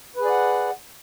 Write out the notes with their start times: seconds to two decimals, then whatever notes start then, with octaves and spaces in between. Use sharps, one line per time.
0.16 B4
0.21 G#4
0.25 D5
0.30 F#5